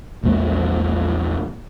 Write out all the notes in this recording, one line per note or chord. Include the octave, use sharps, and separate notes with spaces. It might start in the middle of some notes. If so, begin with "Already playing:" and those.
A#1 E2 G#3 A#3